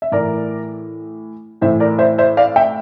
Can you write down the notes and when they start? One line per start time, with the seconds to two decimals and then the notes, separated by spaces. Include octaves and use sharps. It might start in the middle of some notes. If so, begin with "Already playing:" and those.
0.02 E5
0.12 A2 E3 A#4 D5
1.61 A2 E3 C5 E5
1.80 A#4 D5
1.99 C5 E5
2.18 C5 E5
2.37 D5 F5
2.56 E5 G5